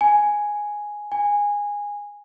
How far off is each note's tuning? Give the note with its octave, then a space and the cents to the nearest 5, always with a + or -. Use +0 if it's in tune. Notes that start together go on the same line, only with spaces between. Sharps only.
G#5 +0
G#5 -15